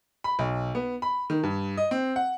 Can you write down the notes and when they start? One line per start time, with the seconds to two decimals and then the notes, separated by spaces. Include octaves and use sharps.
0.24 B5
0.39 B1
0.75 B3
1.02 B5
1.30 D#3
1.43 G2
1.77 D#5
1.91 C4
2.16 F#5